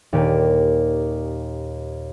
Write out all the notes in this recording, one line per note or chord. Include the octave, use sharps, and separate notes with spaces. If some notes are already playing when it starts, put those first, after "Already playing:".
D#2 A#2 C#4 G4 A4 D7